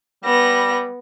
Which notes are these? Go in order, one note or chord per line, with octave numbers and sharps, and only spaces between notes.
G3 B3 A#6